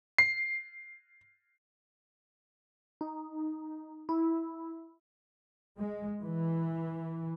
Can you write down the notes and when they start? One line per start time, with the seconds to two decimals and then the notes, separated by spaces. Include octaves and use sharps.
0.18 C7
3.01 D#4
4.09 E4
5.79 G#3
6.23 E3